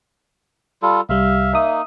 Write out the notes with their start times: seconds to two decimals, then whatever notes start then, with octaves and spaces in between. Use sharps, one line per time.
0.82 G3 F4 A4
1.09 C2 G3 E5 F5
1.53 A#3 D#4 E5 D#6